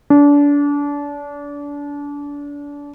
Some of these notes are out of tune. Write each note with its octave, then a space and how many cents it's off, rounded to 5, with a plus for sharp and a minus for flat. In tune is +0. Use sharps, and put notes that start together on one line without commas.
D4 -30